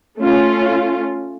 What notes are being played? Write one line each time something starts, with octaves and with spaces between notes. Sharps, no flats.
A3 C#4 F4